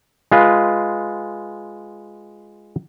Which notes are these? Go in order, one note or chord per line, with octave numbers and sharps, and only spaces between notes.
G#3 F4 B4